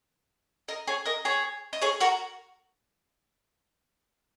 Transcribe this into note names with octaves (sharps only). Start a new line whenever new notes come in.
A#4 D#5
G#4 C#5
A#4 D#5
G#4 C#5
D#5
G#4 C#5
F#4 A#4